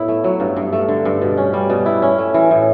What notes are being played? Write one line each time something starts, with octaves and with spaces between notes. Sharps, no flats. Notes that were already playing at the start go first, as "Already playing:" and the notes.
Already playing: A2 B3 E4
A3
F#3
G2
G2
A3
D3
G2
B2
C#4
G3
B2
E4
C#4
A3
E3
A2